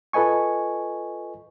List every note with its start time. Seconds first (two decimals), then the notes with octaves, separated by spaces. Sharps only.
0.13 F4 A4 B4 D#5 G#5 C#6